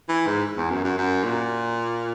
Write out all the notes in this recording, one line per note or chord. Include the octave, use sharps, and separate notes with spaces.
E3
G#2
E2
F#2
F#2
F#2
A#2